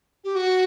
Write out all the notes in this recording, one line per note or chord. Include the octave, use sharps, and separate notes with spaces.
G4
F#4